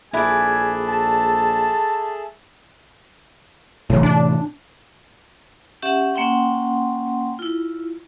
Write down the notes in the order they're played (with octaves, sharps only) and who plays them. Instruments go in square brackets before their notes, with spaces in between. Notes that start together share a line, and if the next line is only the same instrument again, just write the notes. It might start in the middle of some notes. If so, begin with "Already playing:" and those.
[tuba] A#1 [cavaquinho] E4 B4 D5 [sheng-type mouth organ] G#4 A4 E5 [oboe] G#5
[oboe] A5
[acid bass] F#1 [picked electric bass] A2 C3 E3
[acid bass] D4
[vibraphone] C#4 G4 E5 F#5
A#3 C#4 F#5 G5 C6
E4 F4